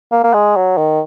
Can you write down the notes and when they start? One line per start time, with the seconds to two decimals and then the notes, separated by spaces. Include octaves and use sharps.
0.12 A#3
0.24 A#3
0.33 G#3
0.56 F#3
0.77 D#3